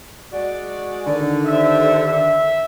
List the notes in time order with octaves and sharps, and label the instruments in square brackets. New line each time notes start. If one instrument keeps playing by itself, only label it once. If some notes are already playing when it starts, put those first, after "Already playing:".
[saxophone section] G#3 F#4 D5
D3 D#3
[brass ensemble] G4 C5 E5
E5